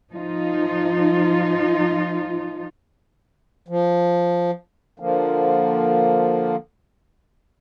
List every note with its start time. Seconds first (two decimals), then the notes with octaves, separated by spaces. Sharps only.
0.12 F3 D#4 F4
3.68 F3
5.00 D3 F3 A#3